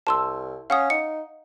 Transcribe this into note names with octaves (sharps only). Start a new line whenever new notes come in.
C2 A5 C6 E6
C#4 F5 F#5 D#6
D#4 C#7